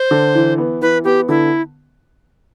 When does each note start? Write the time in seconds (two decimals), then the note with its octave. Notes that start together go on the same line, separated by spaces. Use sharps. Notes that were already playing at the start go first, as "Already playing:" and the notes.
Already playing: C5
0.11 D3
0.35 E3
0.58 B3
0.82 E3 B4
1.04 B3 G4
1.29 D3 E4